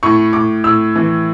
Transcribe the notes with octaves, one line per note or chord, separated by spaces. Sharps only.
A2 C#6
A2 D6
A2 E6
E3